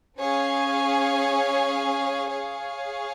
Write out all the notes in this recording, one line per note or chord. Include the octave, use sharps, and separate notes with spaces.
C#4 G#4 C#5 F5 G#5
G#4 C#5 F5